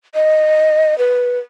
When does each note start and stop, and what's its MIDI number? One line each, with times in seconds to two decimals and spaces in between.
0.14 0.97 75
0.98 1.39 71